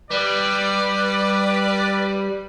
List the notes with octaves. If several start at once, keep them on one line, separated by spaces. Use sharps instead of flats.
G3 B4 D5